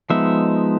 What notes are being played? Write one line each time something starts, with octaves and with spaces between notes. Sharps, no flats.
F3 G#3 B3 D#4 E5